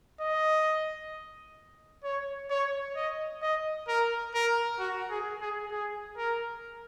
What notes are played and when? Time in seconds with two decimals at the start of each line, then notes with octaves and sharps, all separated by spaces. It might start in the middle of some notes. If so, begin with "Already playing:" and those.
0.21 D#5
2.04 C#5
2.50 C#5
2.95 D#5
3.42 D#5
3.88 A#4
4.34 A#4
4.79 F#4
5.10 G#4
5.41 G#4
5.71 G#4
6.17 A#4